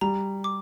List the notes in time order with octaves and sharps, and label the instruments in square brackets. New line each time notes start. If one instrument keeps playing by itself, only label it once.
[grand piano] G3 [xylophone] A#5
[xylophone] D6